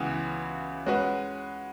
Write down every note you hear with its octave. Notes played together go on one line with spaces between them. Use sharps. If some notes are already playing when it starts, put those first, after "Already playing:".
Already playing: C#2 C#3 E3 B3 F#4
G#3 C#4 F#4 B4